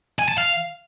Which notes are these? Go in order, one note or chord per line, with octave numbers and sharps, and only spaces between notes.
G#5
A5
F5